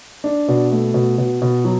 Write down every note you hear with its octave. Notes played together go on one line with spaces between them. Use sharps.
D4
B2
A3
B2
B2
B2
F#3